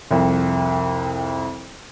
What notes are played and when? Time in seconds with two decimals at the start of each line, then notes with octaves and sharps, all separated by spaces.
0.11 C2 F2